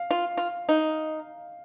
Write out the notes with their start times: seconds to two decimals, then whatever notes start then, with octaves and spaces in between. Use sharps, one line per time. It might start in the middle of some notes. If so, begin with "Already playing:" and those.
Already playing: F5
0.11 F4
0.37 F4
0.69 D#4